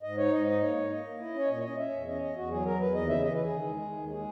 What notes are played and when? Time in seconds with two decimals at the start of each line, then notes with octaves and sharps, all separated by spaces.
0.03 G#2 D#5
0.17 D#4 C#5
0.32 G#2 D#5
0.47 D#4 D#5
0.61 A#3 C#5
0.76 D#4
0.90 A#3 D#5
1.05 A#3
1.19 E4
1.34 C#4 C#5
1.49 A#2 D#5
1.59 C#5
1.63 C#4 D#5
1.78 C#4 E5
1.92 E2
2.07 C#4 D#5
2.22 E2 D#5
2.36 E2 F#4
2.51 F#3 G#4
2.65 E2 A#4
2.80 E2 B4
2.94 D#2 D#5
3.09 C#3 E5
3.24 E3 D#5
3.34 B4
3.38 C#3
3.44 G#4
3.52 D#3
3.68 G#3
3.82 D#3
3.97 D#2
4.11 G#3 G#4